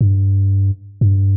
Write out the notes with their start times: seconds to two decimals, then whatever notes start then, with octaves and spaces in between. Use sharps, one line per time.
0.01 G2
1.01 G2